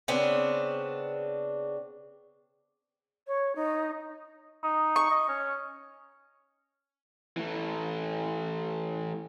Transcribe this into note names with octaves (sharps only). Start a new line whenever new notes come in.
C#3 B3 C4 D4
C#5
D#4
D#4
C#6
D#5
C#4
E3 A3